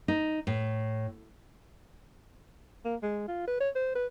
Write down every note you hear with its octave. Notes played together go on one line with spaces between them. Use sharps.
D#4
A2
A#3
G#3
F4
B4
C#5
C5
B4